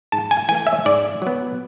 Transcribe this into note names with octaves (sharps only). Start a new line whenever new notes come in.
G#2 A5
G#5
E3 A3 G#5
E5
G#2 D5
F#3 B3